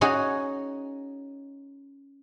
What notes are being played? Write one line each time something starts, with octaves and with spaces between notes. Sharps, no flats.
C#4 D#4 F#4 G#4